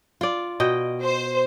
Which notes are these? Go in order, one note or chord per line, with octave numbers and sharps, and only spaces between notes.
F4 D5
B2 D#5 G5
C5